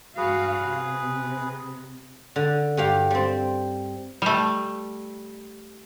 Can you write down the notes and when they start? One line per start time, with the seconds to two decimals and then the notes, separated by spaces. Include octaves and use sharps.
0.17 G2 F#4 G#4 B4 F5
0.64 C3
2.36 D3
2.77 G2 G4 F5
3.11 G3 C4
4.22 G3 A3